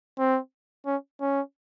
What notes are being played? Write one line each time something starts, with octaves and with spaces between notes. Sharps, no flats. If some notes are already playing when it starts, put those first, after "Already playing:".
C4
C#4
C#4